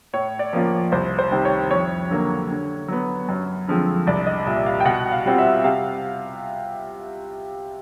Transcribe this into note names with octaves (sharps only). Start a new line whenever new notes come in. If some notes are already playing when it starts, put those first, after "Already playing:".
A2 C#5
D5
F3 A#3 C#4 F4
C2 C5
C5
C3 D#3 G3
C#5
F2 C#5
D3 F#3 A#3
D3
F#3 B3
F#2
D3 F3 G#3 C4
C2 D5
D#5
A#2 G3 E5
F5
G5
B2 F#5
F5
G3 C4 F4
E5
C3 F5